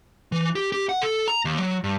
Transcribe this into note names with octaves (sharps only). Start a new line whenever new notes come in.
E3
G4
G4
F#5
A4
A#5
D#2
F#3
G2